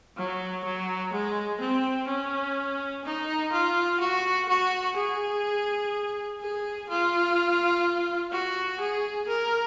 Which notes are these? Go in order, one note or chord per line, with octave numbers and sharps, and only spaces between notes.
F#3
F#3
G#3
C4
C#4
D#4
F4
F#4
F#4
G#4
G#4
F4
F#4
G#4
A#4